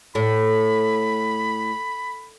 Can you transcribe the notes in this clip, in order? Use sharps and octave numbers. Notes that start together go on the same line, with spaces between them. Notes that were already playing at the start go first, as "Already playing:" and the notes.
A2 B5